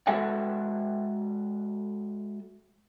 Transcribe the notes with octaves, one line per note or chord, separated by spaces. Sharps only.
G#3 F#4 A4 E5 F#5 G5